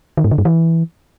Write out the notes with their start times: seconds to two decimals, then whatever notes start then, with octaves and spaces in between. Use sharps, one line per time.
0.17 D#3
0.24 G#2
0.31 D3
0.38 G2
0.45 E3